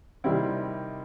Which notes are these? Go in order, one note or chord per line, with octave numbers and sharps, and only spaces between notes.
C3 D#3 G3 C4 E4